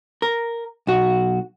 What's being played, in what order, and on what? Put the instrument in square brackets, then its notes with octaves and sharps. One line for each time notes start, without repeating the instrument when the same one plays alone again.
[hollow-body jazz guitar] A#4
B1 F#4